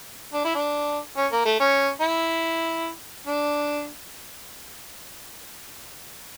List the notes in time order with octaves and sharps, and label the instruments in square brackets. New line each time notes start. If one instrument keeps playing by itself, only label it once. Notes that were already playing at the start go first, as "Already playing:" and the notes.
[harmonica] D4
E4
D4
C#4
A#3
A3
C#4
E4
D4